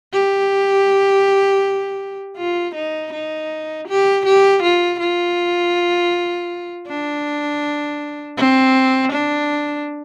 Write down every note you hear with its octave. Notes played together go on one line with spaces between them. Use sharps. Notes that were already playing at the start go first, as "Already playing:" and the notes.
G4
F4
D#4
D#4
G4
G4
F4
F4
D4
C4
D4